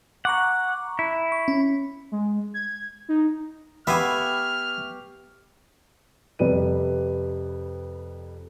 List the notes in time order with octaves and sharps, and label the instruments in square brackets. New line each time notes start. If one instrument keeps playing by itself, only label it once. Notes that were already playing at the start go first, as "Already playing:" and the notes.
[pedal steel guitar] F#5 [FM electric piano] A#5 C#6 D6
[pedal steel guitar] E4
[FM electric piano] C#6
C#4
[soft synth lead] G#3
G#6
D#4
[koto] B3 [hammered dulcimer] G4 C#6 [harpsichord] E5 F5 G#5 [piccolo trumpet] F6
[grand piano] F2 C3 G3 B4 D#7